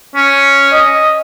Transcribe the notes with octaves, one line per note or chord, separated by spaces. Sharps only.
C#4
D#5